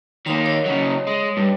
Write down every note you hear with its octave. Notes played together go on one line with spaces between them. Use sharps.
D#3 A#3 C#5 C6 D#6
C#5 D#5
C#3 F#3
G#3
G2